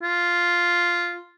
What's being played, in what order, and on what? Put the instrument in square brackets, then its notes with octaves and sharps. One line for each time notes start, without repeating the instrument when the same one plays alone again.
[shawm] F4